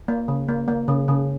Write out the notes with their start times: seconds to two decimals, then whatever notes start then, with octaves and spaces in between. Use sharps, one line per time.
0.08 A#3
0.28 C#3
0.48 A#3
0.68 A#3
0.88 C#3
1.08 C#3